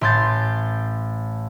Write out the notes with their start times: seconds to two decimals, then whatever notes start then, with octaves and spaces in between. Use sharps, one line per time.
0.01 A1 C6 G6 A6